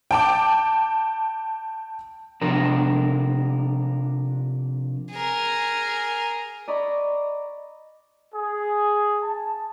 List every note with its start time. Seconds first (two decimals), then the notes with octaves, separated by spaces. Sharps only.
0.11 G5 A5 D6
2.41 C3 F3 D4 A#4
5.12 G#4 A#4
6.68 D5 D#5 A#5 B5 C#6
8.34 G#4
9.23 A5